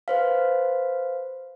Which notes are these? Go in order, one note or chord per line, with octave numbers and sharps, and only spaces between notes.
B4 C5 F5